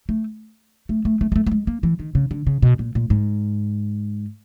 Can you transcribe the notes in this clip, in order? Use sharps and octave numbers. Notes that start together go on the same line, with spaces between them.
A3
A3
A3
A3
G#3
A3
A3
G#3
A#3
E3
D#3
C#3
D3
C#3
B2
A#2
A#2
G#2